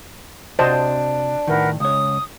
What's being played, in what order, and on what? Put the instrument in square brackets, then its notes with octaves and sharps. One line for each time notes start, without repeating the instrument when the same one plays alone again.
[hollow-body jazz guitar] C3 F#4 [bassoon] D4 [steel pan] C5 D#5 A5
[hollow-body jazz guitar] A2 D#3 [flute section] A#4 B4 F#5
[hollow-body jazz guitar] C#2 C#5 [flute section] D#6